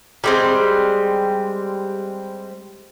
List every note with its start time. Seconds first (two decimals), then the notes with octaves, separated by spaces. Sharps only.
0.24 G3 G#3 C4